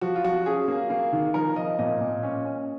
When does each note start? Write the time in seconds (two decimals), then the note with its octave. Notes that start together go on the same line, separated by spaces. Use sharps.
0.01 F3 F#4
0.16 F4
0.24 F3 F#4
0.46 C#4 G#4
0.68 A#3
0.90 A#3
1.13 D#3
1.34 F3 A#4
1.56 F3 D#5
1.79 A#2 D#5
2.01 A#2
2.23 C#4
2.45 C#4